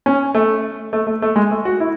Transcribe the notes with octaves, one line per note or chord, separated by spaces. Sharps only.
C#4
A3
A3
A3
A3
G#3
A3
F#4
E4